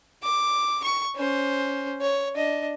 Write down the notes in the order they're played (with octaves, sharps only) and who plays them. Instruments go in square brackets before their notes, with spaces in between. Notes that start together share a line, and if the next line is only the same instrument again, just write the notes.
[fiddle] D6
C#6
C#4 C5
C#5
D4 D#5